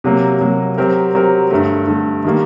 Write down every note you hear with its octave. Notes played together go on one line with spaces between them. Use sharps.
C3 F#3 A#3
C3 F#3 A#3
F#3 C4 G4 A#4
F#3 C4 G4 A#4
G2 D3 A3
G2 D3 A3
D#3 G3 A#3